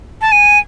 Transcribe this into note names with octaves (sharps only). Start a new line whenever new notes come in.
A5
G#5